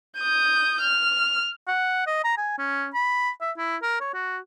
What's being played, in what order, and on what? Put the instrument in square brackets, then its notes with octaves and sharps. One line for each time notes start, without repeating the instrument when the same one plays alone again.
[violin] D#6 G6
F6
[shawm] F#5
D#5
A#5
G#5
C#4
B5
E5
E4
A#4
C#5
F#4